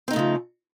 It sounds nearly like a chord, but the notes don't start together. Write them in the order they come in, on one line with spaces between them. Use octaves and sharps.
C4 D#4 A3 C#3 F3